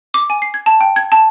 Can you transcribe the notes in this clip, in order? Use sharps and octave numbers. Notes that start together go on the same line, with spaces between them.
D6
G#5
C7
G#6
A5
G5
G#6
A5